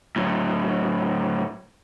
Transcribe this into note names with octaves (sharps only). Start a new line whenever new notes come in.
A2 F#3